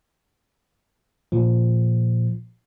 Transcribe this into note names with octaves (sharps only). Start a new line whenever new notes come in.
A#2 F3